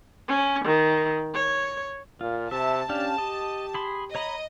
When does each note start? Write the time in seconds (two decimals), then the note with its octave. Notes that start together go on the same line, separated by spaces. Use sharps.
0.28 C#4
0.65 D#3
1.34 C#5
2.21 A#2 F4
2.51 C3 E5 A5
2.89 C#4 D4 G4 F5
3.18 G4 D#5
3.74 G#4 B5 C6
4.15 C#5 D#5 A#5 B5